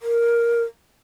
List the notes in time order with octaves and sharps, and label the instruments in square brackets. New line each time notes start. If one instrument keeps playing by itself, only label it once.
[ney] A#4